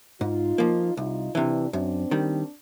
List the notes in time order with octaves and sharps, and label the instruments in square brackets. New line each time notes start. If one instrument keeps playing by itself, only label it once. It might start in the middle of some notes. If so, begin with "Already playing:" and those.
[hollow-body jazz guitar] G#2 [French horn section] D#4 F4
[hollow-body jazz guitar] F3 A#3
[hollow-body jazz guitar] C2 [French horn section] D#4 F4
[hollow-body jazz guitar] C3 E3 [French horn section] D4 E4
[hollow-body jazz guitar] F#2 [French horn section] C4 D4
[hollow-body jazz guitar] D#3 G3